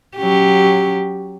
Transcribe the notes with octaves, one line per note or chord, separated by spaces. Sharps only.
F#3 C#4 G4